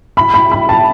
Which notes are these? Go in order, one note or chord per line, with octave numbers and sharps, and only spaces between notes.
B5
B5
B5
A5